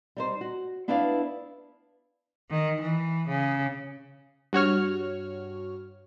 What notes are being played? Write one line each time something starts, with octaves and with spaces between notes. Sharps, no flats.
G3 D#4 C5
F#4
B3 D4 E4 B4 D5 F5
D#3
E3
C#3
G2 F#4 C#5 F6